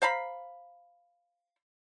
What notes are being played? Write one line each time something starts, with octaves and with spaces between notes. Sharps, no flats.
C5 F5 A#5 B5